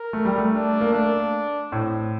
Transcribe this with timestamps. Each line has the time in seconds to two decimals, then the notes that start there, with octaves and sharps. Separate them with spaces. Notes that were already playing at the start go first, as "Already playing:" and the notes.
Already playing: A#4
0.13 A3
0.25 G3
0.38 A3
0.53 D4
0.81 A#3
0.92 A3 D4
1.72 A2 C4